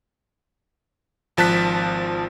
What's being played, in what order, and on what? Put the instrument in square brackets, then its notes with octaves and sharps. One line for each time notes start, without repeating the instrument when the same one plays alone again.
[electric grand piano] G#1 F3 A5 F#6 B6